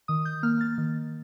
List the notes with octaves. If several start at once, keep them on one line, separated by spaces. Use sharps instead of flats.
D#3 D#6
G6
A#3 F6
A6
D#3